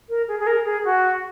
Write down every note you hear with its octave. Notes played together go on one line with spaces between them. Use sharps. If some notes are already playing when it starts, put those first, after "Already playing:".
A#4
G#4
G#4
A#4
G#4
F#4